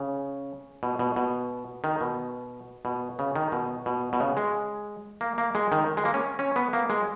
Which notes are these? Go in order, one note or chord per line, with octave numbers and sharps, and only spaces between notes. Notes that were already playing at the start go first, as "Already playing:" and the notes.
Already playing: C#3
B2
B2
B2
D#3
B2
B2
C#3
D#3
B2
B2
B2
C#3
G#3
A#3
A#3
G#3
D#3
G#3
A#3
C#4
C#4
B3
A#3
G#3